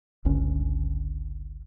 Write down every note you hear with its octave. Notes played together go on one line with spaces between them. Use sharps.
G1 C#2 D3 C#4